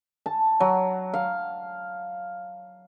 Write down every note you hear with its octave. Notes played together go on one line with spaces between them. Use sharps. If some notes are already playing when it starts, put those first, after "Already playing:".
A5
F#3
F5